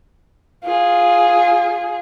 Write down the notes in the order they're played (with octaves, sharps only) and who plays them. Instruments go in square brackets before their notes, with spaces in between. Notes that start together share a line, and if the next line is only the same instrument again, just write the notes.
[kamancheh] F4 G#4